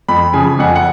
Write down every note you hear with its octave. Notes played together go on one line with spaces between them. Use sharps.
F2 B5
C#3 F3 G#5
F2 F#5
G#5
F#5